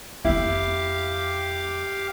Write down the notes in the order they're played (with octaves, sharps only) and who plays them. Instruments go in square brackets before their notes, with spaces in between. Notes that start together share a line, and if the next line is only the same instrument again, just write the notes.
[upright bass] F2 C4 [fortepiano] E4 [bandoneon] G4 F5 D6